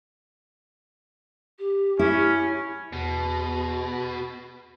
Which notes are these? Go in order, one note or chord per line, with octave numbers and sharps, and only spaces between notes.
G4
C#4 E4
E2 B2